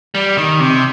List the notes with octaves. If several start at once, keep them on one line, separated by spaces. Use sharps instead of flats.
G3
D#3
C3